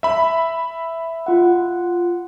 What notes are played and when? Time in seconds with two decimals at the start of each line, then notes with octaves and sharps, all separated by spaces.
0.03 E5 B5
1.26 F4 F#5